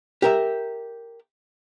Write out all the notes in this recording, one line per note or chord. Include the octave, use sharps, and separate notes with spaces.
G4 A#4 E5